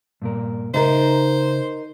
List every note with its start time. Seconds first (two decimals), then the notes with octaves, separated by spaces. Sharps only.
0.22 G2 A#2 A#4
0.74 C#3 D#4 A#4 C5 E5 A#5